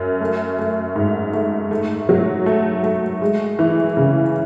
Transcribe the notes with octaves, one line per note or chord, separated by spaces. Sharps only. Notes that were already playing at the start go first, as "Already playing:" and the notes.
Already playing: F#2
A3
A3
G#2
A3
A3
F#3
A3
A3
G#3
E3
C#3